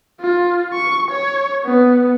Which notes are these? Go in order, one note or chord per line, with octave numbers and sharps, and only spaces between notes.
F4
C#6
C#5
B3